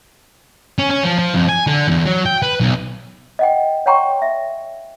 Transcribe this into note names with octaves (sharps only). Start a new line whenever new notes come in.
C#4
C#4
F3
F3
F2
G#5
D3
E2
F#3
G5
B4
B1
D#5 F#5 G5
C#5 F#5 G5 A#5 C6 C#6
E5